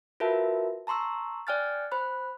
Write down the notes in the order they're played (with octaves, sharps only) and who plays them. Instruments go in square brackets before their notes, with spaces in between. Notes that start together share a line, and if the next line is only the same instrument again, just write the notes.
[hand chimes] F4 F#4 A#4 B4 E5 A5
A5 A#5 C6 C#6 E6
D5 G5 G#5 F6 F#6 A6
C5 B5 F#6